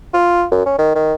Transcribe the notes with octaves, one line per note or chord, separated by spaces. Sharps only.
F4
F#2
C#4
D#3
D#3